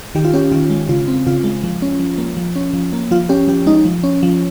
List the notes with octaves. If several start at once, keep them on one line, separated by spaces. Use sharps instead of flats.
D#3 G4
F4
C#4 G4
D#3 F4
G#3
C#3 F4
C4
C#3 F4
G#3
F3
C#4
F3
A#3
F3
C#4
F3
A#3
F3 F4
C#4 G4
F3 G4
G#3 D#4
F3
C#4
F3